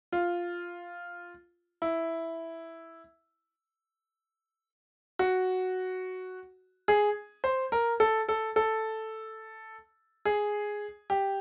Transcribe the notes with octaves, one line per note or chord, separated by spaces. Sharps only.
F4
E4
F#4
G#4
C5
A#4
A4
A4
A4
G#4
G4